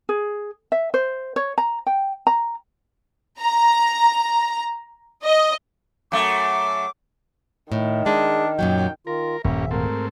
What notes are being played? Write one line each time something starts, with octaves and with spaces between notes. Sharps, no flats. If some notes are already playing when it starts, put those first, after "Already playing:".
G#4
E5
C5
C#5
A#5
G5
A#5
A#5
D#5
F#2 A3 D6
A2 D#3
G#3 D4
F#2 A#2 F#3 G5
D#3 F4 A#4
D#1 G2 A#3 C#4 E5
G#2 A3 C4 A#4